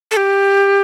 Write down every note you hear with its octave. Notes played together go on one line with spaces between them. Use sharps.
A4
G4